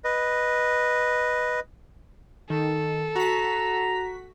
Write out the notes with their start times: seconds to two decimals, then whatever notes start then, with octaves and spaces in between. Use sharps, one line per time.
0.04 B4 D#5
2.50 D#3 A4
3.15 F#4 A#5 B6